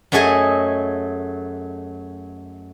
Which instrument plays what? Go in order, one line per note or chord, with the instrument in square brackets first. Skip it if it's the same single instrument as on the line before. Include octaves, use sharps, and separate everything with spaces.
[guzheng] F#2 F#3 A3 G#4 D#5 G#5